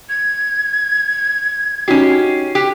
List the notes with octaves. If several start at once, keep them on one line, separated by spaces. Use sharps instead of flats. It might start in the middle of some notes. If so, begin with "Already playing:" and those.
G#6
C#4 D#4 F#4 G4 C7
G4 F#6